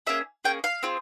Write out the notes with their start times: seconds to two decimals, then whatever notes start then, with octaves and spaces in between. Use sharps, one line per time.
0.07 A#3 C#4 G#4 E5
0.45 A#3 C#4 G#4 G5
0.64 F5
0.83 C4 F4 G#4